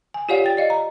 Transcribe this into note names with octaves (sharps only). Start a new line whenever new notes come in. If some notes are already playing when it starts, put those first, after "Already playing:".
G#5
F4 G4 C#5 D5 F5 F#5
G5 A6
D5 D#5 F5
A#5